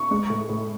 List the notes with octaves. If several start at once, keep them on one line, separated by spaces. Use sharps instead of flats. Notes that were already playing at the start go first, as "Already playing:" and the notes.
Already playing: C#6
G#3
A2
A2